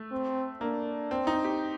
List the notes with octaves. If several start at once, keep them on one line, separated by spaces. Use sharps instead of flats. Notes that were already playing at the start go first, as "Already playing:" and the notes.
Already playing: A3
C4
A#3 D4
C4
D#4
G4